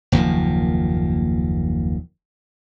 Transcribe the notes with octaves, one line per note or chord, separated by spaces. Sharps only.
F#1 D#2 A#2 F3